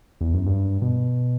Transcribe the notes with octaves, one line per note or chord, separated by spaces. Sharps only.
E2
F#2
G2
B2